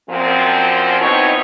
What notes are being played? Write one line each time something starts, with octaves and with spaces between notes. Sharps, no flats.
F#2 A#2 F3 C4
B2 F#3 C4 D#4 E4 C#5